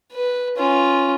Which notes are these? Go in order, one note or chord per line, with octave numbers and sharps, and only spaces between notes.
B4
C#4 F4